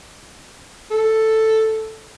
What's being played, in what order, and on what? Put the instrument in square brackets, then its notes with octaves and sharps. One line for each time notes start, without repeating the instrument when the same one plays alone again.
[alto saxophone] A4